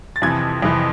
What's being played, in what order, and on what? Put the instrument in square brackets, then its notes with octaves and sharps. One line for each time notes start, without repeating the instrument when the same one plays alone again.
[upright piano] A6
F2 C3 E3 G#6
F2 C3 E3